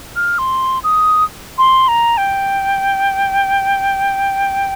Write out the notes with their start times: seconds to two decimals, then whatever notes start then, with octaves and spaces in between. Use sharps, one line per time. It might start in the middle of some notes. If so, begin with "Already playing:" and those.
0.16 F6
0.39 C6
0.84 D#6
1.58 C6
1.88 A#5
2.18 G5